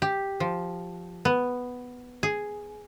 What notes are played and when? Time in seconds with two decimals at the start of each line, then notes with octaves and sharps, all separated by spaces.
0.02 G4
0.40 F3
1.25 B3
2.23 G#4